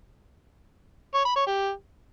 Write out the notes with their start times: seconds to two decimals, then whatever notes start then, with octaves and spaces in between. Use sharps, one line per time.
1.14 C#5
1.25 B5
1.36 C#5
1.47 G4